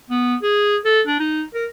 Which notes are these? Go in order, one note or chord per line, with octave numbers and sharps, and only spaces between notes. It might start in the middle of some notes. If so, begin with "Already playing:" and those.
B3
G#4
A4
D4
D#4
A#4